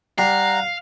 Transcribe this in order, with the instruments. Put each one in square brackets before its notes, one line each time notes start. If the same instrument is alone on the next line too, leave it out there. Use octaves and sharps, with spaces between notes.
[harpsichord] G3 [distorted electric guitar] F5 [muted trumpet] F#5 [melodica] A#5